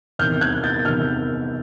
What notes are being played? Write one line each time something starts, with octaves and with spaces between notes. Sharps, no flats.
E2 C3 D#3 F6 G6
F#6 G#6
G6 A6
E2 C3 D#3 F6 G6